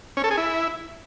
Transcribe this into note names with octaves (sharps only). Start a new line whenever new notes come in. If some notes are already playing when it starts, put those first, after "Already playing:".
C#4
A4
G#4
E4